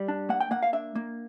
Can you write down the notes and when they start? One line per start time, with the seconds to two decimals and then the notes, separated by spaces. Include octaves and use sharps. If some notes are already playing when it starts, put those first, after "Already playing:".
Already playing: G3
0.08 D4
0.29 A#3 F#5
0.41 G5
0.51 A#3 F#5
0.63 F5
0.73 D4 E5
0.95 A#3